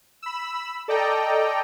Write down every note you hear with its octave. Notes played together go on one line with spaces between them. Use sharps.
B5 E6
A4 D5 D#5 G5 A#5